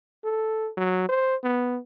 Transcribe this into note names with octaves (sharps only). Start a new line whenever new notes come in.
A4
F#3
C5
B3